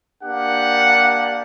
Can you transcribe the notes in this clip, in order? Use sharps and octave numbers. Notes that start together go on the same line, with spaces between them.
A#3 D4 G4 F#5